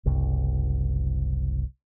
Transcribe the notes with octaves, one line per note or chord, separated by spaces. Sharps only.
F#1 C2